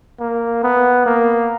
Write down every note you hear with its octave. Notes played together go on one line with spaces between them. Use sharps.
A#3
B3
A#3